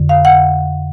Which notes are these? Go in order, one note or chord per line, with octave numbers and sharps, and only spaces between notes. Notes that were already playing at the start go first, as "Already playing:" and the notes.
Already playing: F2 D3
F5
F#5